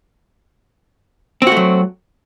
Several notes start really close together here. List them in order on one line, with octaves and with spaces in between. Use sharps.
C4 F#4 A3 F#3